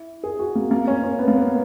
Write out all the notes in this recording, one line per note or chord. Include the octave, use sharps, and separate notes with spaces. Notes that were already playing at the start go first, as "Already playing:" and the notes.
Already playing: E4
G#4
F#4
A#3
A#3
C#4
C#4
B3
A#3
B3